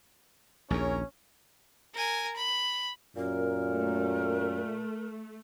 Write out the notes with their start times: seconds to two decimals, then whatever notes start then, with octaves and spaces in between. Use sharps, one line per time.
0.70 A#1 D#2 C#4 G#4 A#4 C#5
1.95 A#4 G#5
2.37 B5
3.16 F#2 A#2 A#4
3.65 A3